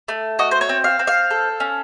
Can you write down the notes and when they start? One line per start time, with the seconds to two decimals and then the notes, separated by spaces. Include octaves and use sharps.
0.08 A3
0.39 F#4 D#5
0.51 C5
0.61 C#5
0.69 C4
0.84 F5
0.99 C4
1.07 F5
1.30 A4
1.60 C#4